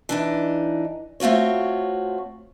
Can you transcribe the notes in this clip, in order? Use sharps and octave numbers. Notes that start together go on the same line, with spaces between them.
E3 D4 D#4
A3 C4 F4 F#4 C#5